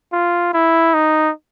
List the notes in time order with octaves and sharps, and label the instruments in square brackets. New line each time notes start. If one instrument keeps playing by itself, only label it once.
[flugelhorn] F4
E4
D#4